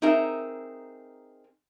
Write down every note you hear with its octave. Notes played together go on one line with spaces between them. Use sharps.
C4 D#4 G#4 A#4 E5